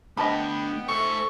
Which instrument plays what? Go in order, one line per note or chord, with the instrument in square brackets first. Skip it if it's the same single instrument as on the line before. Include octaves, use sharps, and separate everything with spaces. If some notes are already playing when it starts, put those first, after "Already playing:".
[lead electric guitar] A3 D4 [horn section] B3 G5 [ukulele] D#5 A5 B5
[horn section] A4 E5 [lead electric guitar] C5 G#5 [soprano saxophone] C#6